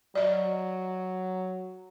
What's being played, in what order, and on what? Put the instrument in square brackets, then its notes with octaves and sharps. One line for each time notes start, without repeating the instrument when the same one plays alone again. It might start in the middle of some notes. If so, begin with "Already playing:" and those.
[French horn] F#3 [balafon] D5 D#5